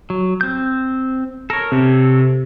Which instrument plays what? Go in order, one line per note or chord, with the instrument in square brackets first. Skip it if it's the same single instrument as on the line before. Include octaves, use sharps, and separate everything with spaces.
[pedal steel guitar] F#3
C4 G6
[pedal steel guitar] A4 C#5 [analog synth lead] A#4
[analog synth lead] C3